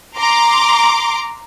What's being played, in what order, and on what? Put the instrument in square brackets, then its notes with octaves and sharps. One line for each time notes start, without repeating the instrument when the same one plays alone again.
[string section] A#5 C6 D6